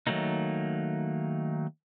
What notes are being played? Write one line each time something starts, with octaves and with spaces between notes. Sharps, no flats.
D#3 F#3 A3 A#3 D#4